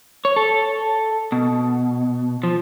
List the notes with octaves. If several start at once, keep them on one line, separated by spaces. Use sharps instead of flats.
C#5
A4
B2
F3